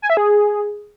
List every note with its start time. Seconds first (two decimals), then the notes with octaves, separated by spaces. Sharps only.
0.02 G#5
0.10 E5
0.17 G#4